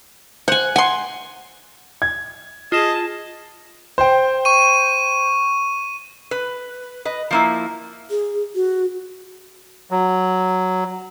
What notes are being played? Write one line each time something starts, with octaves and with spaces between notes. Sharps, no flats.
C5 F#5 G#5
F#5 G#5 C6
G#6
F4 G#4 D#5 A5 E7
C5 G5
C#6 D#7
B4
B4 D#5
F3 A#3 E4
G#4
F#4
F#3